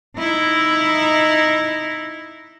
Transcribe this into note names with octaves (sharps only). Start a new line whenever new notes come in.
D#4 E4